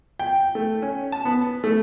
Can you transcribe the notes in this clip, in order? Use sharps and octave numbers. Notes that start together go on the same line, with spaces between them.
G5
A3
C#4
A5
B3
A3